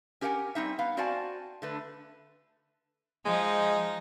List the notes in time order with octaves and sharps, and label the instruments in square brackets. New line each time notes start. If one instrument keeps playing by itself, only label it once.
[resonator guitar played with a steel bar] C#4 G4 A#4 E5 F#5 G#5
G3 C4 D#4 E5
B3 F5
C4 F#4 D5 F5 G#5 A5
D3 A3 B4
[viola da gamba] F3 [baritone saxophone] G#3 [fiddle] D#4 D#5